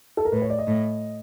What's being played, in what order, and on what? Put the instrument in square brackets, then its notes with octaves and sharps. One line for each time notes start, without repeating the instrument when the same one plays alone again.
[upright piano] A4
A#4
[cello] A2 [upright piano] B4
[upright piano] C#5
D5
D#5
[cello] A2